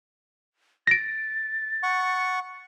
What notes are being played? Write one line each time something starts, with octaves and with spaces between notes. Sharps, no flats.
A6 A#6 D7
F#5 C#6